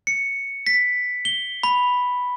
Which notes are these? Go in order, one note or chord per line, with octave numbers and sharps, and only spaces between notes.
C#7
B6
G7
B5